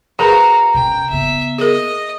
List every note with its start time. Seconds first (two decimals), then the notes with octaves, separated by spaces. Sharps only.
0.19 F#4 G#4 A#4 B4 F5 A#5
0.74 B2 C#4 G5
1.10 C#3 B3 E5
1.58 G#4 A#4 D#5